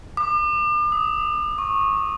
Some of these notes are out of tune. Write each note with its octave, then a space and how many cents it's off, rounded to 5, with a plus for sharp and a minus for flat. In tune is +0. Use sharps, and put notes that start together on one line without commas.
D6 +40
D#6 +20
C#6 -20